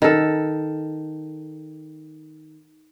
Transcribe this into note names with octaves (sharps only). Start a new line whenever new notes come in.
D#3 A4